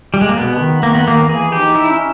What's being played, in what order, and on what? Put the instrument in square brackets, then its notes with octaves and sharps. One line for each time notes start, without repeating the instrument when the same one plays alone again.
[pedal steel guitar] G3
G#3
A#3
[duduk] B2 [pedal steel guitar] B3
[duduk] D#3
[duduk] D#3 [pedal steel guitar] A#3
[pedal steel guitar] B3
[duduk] D#3 [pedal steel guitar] A#3
[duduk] E3 [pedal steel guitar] G#4
[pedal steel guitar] G4
[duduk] D#4
[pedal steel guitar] E4
[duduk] C#4